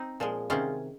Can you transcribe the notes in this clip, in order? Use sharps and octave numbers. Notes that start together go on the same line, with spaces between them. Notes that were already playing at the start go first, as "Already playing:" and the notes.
Already playing: C4 D#4
A#2 F3 G#3
C3 D#3 G#3 C#4 F4